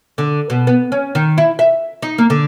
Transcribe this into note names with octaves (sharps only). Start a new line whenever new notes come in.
D3
B2
B3
C#4
D#3
E4
E5
D#4
A#3
D3